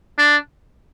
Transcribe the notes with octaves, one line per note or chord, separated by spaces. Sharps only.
D4